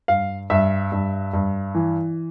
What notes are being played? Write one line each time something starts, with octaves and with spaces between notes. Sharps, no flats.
G2 F5
G2 E5
G2
G2
E3